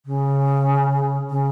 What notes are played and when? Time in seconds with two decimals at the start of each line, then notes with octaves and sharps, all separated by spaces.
0.06 C#3
1.30 C#3